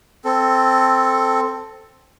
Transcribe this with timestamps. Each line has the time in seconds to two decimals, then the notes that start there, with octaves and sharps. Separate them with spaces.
0.25 C4 A4